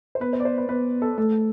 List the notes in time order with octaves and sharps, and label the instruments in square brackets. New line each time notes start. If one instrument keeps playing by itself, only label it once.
[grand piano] C5
[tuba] B3 [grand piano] B4
[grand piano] C5
D5
C5
B4
[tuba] B3 [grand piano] B4
[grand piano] A4
[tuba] A3 [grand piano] A4